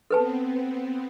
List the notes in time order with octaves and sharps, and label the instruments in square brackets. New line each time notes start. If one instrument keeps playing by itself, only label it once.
[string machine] B3 C4 [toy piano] A4 B4 A5